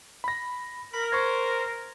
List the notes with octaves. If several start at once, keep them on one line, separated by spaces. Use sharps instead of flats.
B5 A#6
A#4 B5
C5 C#6 G#6